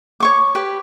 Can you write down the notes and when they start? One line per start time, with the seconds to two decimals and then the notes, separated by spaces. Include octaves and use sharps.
0.20 C#5 C#6 D6
0.55 G4 B4